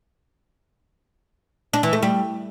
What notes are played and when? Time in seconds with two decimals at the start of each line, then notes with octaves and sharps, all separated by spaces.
1.73 D4
1.83 E3
1.93 A3
2.02 G3